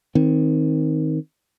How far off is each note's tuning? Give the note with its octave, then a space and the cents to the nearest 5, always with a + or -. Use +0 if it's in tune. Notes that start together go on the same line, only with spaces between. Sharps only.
D#3 +10 C4 +0